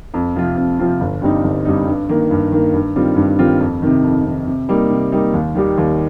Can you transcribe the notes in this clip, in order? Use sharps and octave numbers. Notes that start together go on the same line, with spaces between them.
F2
C3 F3 C4 F4
F2
C3 F3 C4 F4
G1
G2 G3 C4 D#4
G1
G2 G3 C4 D#4
G2
D#3 A#3
G2
D#3 A#3
G2
D#3 G3 C4 F4
G2
D#3 G3 C4 F4
F2
C3 D#3
F2
C3 D#3
C3
G3 A#3 D#4
C3
G3 A#3 D#4
D#2
D#3 G3 D#4 G4
D#2